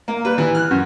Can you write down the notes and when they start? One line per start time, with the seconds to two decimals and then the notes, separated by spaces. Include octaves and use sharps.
0.08 A#3
0.25 G3 B4
0.38 E3
0.55 F6 F#6
0.71 F#2